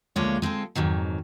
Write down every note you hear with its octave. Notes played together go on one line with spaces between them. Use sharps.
D2 F3 G#3 A#3 D4 C#5
G#3 C4 F4 A4
F2 G#2 D#3 F#3